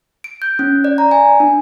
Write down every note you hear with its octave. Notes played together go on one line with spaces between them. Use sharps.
D7
G6
C#4
D5
A#5
G#5
D4